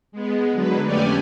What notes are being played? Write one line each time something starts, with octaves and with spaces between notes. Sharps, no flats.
G#3 B3
D3 F#3 B4
F2 A3 C#4 G4 D5 G#5